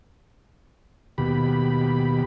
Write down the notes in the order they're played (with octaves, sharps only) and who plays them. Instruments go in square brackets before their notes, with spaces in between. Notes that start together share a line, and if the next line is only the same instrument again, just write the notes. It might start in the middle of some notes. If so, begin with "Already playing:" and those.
[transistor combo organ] D#2 B2 G4 B5